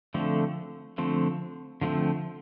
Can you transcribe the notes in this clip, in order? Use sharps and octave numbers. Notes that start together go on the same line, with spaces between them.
D3 F3 A3 C4
D3 F3 A3 C4
D3 F3 A3 C4